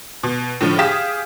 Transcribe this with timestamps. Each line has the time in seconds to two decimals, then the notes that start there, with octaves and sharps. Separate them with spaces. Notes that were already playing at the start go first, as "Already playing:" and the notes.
0.23 B2
0.61 A2 D3 F3
0.79 G4 G#4 F5 D#6 B6 E7